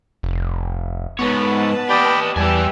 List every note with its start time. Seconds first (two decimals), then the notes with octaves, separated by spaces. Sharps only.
0.23 F1
1.19 G#2 B3 B4 C#5 A5
1.89 G4 D5 D#5 G5 B5
2.36 E2 G3 G4 B4 E5 G#5 A5